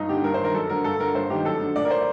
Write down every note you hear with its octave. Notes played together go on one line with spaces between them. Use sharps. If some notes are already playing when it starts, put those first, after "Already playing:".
Already playing: G2 D#4
D3 G4
G2 A#4
C5
D#3
A#4
F#2 A4
D3 A#4
G2 A4
D3 A#4
G2 C5
D#3 G4
F#2 A4
D3
A2 D5
A#4
C5